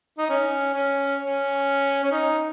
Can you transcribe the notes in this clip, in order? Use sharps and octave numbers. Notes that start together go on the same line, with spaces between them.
D#4
C#4
C#4
C#4
C#4
D#4